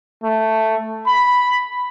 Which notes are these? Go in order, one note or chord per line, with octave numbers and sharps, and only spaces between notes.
A3
B5